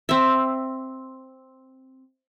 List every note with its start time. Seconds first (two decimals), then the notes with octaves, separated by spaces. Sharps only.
0.09 C4 E5